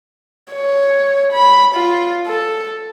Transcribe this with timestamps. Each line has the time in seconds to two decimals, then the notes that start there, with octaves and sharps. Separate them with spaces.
0.53 C#5
1.33 B5
1.75 F4
2.27 A4